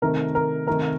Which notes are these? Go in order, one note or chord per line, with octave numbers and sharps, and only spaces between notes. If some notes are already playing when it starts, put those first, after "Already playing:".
C3 D#3 A3 A#4
A#4
C3 D#3 A3 A#4